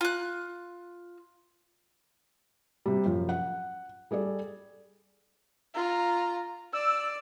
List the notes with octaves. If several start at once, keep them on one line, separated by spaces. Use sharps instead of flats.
F4 F#6
C3 G3
F#2 F3
F#5
G3 G#4 A4 D5
F4 A#5
D5 E6